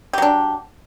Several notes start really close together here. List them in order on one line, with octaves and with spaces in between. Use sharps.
G4 F#3 D4